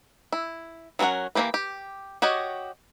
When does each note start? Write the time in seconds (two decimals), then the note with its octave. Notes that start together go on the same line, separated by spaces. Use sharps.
0.33 E4
0.99 F#3 A3 C#4 A#4 F#5
1.35 E3 F#3 A#3 G4 B4
1.54 G4
2.22 F#4 G4 C#5 D#5